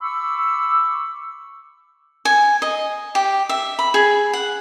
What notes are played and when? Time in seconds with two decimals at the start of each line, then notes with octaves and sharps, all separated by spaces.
0.01 B5 C#6 D6 E6
2.25 G#5
2.62 D#5
3.15 G4
3.49 E5
3.79 B5
3.94 G#4
4.33 F#5